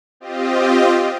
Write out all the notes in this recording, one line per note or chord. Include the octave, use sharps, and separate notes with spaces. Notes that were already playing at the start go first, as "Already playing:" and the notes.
C4 F4 G4 D#5